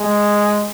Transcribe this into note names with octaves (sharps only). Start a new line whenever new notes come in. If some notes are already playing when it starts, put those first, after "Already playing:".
Already playing: G#3